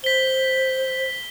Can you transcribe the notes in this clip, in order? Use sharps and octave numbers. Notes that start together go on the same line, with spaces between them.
C5 B6 G7